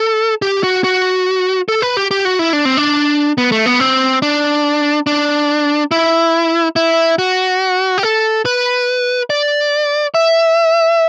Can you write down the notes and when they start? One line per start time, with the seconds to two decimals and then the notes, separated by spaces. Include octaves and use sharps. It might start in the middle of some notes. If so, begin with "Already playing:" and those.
Already playing: A4
0.42 G4
0.63 F#4
0.84 F#4
1.69 A4
1.82 B4
1.97 G4
2.11 G4
2.25 F#4
2.39 E4
2.53 D4
2.65 C4
2.77 D4
3.38 B3
3.52 A3
3.66 B3
3.80 C4
4.22 D4
5.07 D4
5.91 E4
6.76 E4
7.19 F#4
7.98 G4
8.03 A4
8.45 B4
9.30 D5
10.14 E5